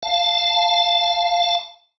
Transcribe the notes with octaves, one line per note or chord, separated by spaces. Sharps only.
F5 A5